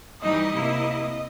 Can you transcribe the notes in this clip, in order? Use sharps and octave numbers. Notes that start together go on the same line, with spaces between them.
E3 G3 D#4 D#5
C3 A#3 E4